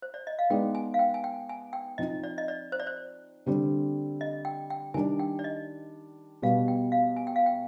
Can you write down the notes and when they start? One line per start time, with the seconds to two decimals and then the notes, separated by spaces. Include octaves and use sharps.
0.02 C5
0.14 D5
0.27 D#5
0.39 F5
0.50 G#3 B3 D#4 B4 D5 G5
0.75 G#5
0.94 F5
0.99 G5
1.14 G#5
1.24 G5
1.49 G#5
1.73 G5
1.98 F3 C4 D#4 D#5
2.23 D5
2.38 D#5
2.48 D5
2.72 C5
2.80 D5
2.87 C5
3.46 D3 G3 C4
4.21 D#5
4.45 G5
4.70 G5
4.94 D#3 G3 D4 G#5
5.19 G5
5.39 D5
5.44 D#5
6.42 B2 G3 B3 F5
6.68 G5
6.92 F5
7.16 G#5
7.27 G5
7.36 F5
7.46 G5